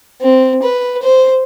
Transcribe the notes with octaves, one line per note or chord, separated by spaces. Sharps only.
C4
B4
C5